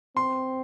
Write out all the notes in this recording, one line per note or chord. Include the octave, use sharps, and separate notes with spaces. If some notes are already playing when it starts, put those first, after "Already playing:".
C4 C6